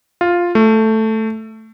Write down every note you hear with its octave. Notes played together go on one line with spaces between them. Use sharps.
F4
A3